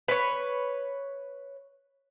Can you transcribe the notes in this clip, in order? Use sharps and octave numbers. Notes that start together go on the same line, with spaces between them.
B4 C#5